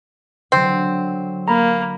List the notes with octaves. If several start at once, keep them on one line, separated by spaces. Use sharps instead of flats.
D3 F#3 C4
A#3 A#5 B5